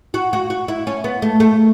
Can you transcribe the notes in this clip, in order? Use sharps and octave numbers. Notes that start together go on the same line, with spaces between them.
F#4
F#4
F#4
E4
C#4
B3
A3
A3